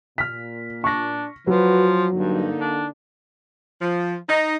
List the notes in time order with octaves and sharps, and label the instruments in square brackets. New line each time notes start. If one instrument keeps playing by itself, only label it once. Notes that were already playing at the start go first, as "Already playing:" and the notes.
[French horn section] A#2 [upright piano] F6 B6
[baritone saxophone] D4 [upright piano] C#6 A#6
[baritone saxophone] F3 [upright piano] F#3 [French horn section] F#4 B4
[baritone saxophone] G2 [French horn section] D3 A#3 D#4
[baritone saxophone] D4
[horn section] F3
D#4